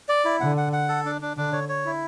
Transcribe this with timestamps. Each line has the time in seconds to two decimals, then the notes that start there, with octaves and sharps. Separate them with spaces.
0.09 D5
0.25 E4
0.40 D3 F#5
0.57 F#5
0.73 F#5
0.89 A4
1.05 D4
1.21 D4
1.37 D3 D4
1.53 C#5
1.69 C#5
1.85 E4